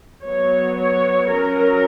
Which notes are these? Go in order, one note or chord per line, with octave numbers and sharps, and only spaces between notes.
F#3 B3 C#5
C#5
F#3 C#4 A#4